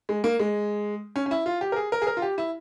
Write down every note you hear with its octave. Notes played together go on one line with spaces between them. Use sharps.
G#3
A#3
G#3
C#4
C#4
E4
F4
G4
A#4
G#4
A#4
G#4
A#4
F4
G4
E4